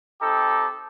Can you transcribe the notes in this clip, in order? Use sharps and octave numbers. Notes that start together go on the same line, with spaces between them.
C4 D#4 G4 A4